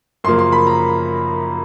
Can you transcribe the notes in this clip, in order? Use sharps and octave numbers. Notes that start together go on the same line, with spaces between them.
F#2 C#3 F3 A#3 C6
C6
B5
A#5